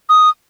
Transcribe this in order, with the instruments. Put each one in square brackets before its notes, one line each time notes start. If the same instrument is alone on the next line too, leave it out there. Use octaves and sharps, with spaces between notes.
[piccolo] D#6